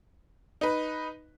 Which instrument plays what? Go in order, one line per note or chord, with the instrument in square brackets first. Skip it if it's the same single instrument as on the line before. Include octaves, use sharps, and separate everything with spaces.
[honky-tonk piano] D#4 B4